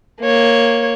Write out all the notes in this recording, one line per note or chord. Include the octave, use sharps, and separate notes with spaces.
A#3 C#5